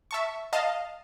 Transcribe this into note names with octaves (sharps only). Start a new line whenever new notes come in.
E5 A5 C#6
D#5 F5 A5